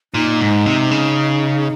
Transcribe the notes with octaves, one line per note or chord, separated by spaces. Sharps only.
A#2 D#4
G#2
C3
C#3